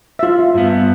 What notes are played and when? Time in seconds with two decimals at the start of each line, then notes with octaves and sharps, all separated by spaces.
0.19 F4 E5
0.54 G2 B3